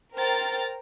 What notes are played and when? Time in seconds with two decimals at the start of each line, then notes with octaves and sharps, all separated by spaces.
0.16 A#4 C5 G5 A#5 F6 A6